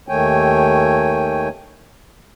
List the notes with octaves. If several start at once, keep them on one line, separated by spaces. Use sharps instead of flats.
D#2 D#3 A3 C#5 G5 G#5